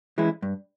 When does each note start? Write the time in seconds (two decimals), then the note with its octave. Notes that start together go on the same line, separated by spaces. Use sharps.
0.18 E3 G#3 C#4 E4
0.42 G2